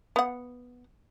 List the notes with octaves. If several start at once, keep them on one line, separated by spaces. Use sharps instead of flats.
B3 F#5